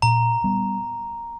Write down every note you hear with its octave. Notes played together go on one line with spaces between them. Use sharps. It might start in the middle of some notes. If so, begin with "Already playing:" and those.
A#2 A#5
G3 B3